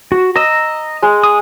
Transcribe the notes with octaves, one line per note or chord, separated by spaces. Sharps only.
F#4
D#5 A#5 E6
G#3
D#6